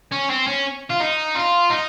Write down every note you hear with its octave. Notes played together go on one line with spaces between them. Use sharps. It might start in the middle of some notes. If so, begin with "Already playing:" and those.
C#4
C4
C#4
F4
D#4
F4
D#4